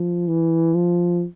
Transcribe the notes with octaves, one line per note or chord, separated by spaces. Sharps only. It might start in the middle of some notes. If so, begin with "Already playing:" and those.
Already playing: F3
E3
F3